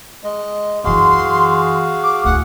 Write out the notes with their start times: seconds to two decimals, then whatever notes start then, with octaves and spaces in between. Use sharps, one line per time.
0.24 G#3 D#5
0.84 F#2 E3 F#4 G#4 F5 C6
2.02 D6
2.24 D2 A2 F#5